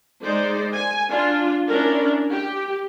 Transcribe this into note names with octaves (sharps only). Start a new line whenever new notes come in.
G#3 D#4 C5 D5
G#5
D4 F4
C#4 D4 E4 A#4 D5
G4